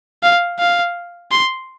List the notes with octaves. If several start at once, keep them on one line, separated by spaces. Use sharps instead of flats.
F5
F5
C6